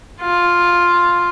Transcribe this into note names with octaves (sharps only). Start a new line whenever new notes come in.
F4